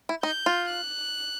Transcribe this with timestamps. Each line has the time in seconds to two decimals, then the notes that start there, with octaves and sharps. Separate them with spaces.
0.09 E4
0.23 D#4 G6
0.46 F4
0.69 F#6